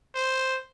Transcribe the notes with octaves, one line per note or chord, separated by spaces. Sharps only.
C5